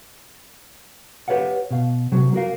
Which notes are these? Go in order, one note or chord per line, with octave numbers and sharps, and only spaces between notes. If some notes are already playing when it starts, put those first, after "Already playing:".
G4 B4 C#5 F5 F#5
B2 F5
C3 F#3 F#4
A#3 F#4 A#4 F5